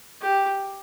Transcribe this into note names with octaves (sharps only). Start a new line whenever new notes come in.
G4